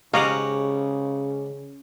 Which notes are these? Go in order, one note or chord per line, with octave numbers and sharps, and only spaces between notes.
G#2 C#3 C#4 G4 D#5 F5 F#5 A#5